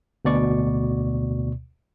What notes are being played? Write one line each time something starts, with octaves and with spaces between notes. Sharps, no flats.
D2 B2 D5 C#6